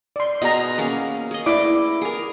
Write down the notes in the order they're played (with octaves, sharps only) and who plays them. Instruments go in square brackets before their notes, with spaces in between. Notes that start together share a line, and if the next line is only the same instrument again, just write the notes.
[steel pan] D5 C6
[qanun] B2 G#4 [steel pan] D#5 A#5
[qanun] A#3 C#4 G#4
G#4 D#5
[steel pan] E4 D5 D6
[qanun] G#4 A#4